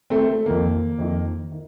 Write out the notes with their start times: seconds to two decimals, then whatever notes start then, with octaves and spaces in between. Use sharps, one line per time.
0.10 A3 C4
0.29 A3
0.46 F2 D#3 A#3
0.99 F2 D#3
1.52 D#3